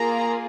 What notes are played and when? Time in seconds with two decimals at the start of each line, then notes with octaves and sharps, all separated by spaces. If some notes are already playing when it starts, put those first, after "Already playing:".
Already playing: A#3 F4 G#4 A#5